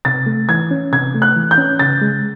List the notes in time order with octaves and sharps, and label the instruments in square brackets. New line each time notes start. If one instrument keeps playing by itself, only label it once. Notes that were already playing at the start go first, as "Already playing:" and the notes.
[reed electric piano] C3 [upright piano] A6
[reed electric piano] A3
[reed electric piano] E3 [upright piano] G#6
[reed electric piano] C#4
[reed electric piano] C3 [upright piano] G#6
[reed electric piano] A3
[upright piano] F#6
[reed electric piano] E3
[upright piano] G6
[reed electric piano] C#4
[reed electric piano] C#3 [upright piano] A6
[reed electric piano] G#3